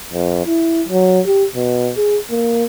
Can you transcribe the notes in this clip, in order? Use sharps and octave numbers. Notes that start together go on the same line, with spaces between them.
F2
E4
F#3
G4
B2
G#4
A#3